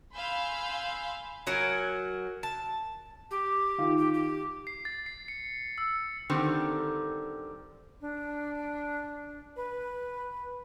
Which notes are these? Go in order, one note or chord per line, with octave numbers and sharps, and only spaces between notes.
F5 G#5 B5 C6 E6 G6
F#3 A#4 F#5 G#5
A5
G4
D#3 F4
G4
G4
C7
A6
C7
C#7
E6
D3 D#3 G3 C4
D4
B4